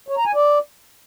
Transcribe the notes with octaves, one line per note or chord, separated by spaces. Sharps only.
C#5
A#5
G#5
D5